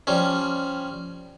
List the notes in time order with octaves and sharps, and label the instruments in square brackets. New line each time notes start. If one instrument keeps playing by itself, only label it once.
[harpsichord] F3 G3 C#4